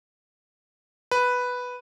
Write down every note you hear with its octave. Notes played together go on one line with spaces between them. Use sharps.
B4